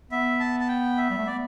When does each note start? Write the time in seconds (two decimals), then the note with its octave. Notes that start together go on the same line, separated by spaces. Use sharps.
0.11 B3 E5
0.40 A5
0.60 A5
0.68 G5
0.97 E5
1.10 G3
1.18 A3
1.26 B3 D5